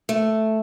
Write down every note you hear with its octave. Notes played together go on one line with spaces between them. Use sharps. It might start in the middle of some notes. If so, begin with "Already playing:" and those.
A3